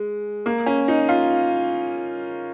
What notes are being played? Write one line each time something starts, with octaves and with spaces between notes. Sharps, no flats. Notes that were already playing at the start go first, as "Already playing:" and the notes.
Already playing: G#3
A#3
C#4
D#4
F4